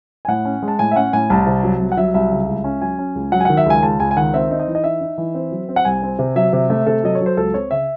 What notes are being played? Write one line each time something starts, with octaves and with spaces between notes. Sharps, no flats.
G#5
A2 F#5
C#4
G#3
A5
A2 G#5
E5
C#4 F#5
A2 G#5
C2 A5
C3
F#3
C2
F#5
F#3 E5
C2 E5
C#3
C#2
C#4
F#3 G#5
C#4
C#2
F#3 F#5
G#5
D#3 F#5
E5
C#2 G#5
C#2 A5
C#2 G#5
G#5
D#3 F#5
C4 E5
D#4
D#5
E3
D#5
D#4 E5
D#4
E3
C4
F#3
C4
F#5
C2 G#5
C4
C3
F#3 E5
C3
A3
C3 A4
F#3 D#5
C#5
F#3
C5
C#2 A4
C4 C#5
C#3 E5